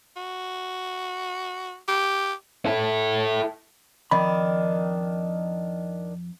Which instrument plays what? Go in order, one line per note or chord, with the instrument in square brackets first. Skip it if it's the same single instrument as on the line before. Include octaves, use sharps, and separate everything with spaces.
[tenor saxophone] F#4
G4
[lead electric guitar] E4 A4
[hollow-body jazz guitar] F2 B5 [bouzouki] D#3 D4